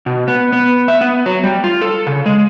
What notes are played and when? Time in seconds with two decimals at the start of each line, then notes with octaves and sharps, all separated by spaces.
0.06 B2
0.28 B3
0.53 B3
0.88 E5
1.01 B3
1.26 F#3
1.44 G3
1.64 F4
1.81 A4
2.07 C#3
2.26 G#3